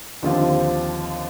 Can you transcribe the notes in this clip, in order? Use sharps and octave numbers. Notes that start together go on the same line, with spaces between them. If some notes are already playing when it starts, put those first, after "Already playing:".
D#2 D3 F3 C4 F4